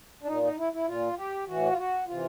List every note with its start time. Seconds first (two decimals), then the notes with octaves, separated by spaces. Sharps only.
0.22 D4
0.27 A#2 D#4
0.43 D#4
0.58 E4
0.73 E4
0.87 A#2 F4
1.18 G4
1.47 A2 E3 F#4
1.70 F4
1.78 F#4
2.07 C3 E3 F4